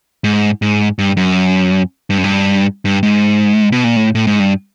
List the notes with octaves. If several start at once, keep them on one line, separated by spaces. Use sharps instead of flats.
G#2
G#2
G2
F#2
G2
F#2
G2
G2
G#2
B2
A#2
A2
A2
G#2
G2